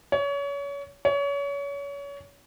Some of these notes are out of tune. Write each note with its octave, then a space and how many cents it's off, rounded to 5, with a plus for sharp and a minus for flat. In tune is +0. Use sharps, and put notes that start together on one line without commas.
C#5 +30
C#5 +30